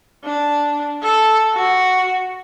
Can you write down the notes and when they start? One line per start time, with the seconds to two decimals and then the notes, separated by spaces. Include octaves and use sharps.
0.25 D4
1.03 A4
1.53 F#4